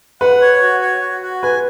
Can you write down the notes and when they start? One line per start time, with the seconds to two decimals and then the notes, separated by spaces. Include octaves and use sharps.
0.21 B4 F#5
0.41 C#5
0.62 F#4
0.81 C#5
1.02 F#4
1.22 F#4
1.43 B4 G#5